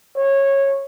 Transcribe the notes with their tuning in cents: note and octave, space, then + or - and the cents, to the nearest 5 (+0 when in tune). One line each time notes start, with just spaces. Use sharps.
C#5 -15